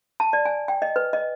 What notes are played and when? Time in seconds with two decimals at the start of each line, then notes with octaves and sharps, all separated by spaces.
0.20 A5
0.33 D5
0.45 G#5
0.68 G5
0.82 D#5
0.96 B4
1.13 D#5